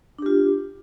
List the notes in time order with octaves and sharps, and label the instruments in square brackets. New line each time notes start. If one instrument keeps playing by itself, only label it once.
[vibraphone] D4
G4
F4